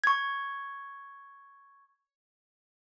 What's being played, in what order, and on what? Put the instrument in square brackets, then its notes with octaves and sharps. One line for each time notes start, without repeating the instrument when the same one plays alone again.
[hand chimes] C#6 G#6